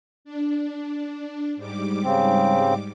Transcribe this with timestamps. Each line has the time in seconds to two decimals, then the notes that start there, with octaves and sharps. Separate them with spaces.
0.25 D4
1.56 G#2 G3 D6
2.04 C#3 C4